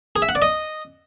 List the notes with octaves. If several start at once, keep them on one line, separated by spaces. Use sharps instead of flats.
G#4
E5
F#5
D5
D#5